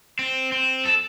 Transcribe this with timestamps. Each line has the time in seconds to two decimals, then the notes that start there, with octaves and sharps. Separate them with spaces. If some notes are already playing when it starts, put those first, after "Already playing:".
0.19 C4
0.52 C4
0.85 A4